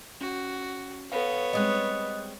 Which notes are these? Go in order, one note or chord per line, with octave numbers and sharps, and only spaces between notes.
C#4 F#4
B3 A4 C#5 F5
G3 G#3 C4 D#5 D#6 F#6